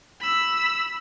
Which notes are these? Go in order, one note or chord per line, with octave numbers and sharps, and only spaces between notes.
B5 E6